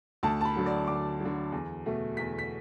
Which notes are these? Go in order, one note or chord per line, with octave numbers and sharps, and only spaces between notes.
D2 A5
A5
B5
D3 F#3
D5
D2 D6
D3 F#3
E2
B2 A3
E2 B6
B6